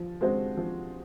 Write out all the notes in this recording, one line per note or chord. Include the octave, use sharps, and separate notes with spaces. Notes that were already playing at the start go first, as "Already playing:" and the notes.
Already playing: F3
G#3 C4 F#4 C5
F3